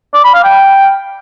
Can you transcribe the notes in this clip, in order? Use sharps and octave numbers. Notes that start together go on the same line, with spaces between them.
D5
B5
F5
G5